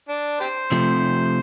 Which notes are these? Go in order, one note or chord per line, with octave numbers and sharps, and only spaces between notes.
D4
G4 C5
C3 F3 A3